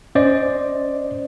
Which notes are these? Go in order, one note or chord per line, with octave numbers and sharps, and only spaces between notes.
C#4 C5 D5 D#5